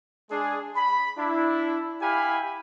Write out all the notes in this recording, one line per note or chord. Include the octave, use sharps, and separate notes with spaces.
G#3 D4 G#4
B5
D4 E4
E4 G4 F5 G#5 B5